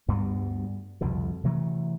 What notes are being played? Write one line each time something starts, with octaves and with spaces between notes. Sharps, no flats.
D2 G2 G3 B3
C2 F2 B2 D3
C3 E3 F#3 A3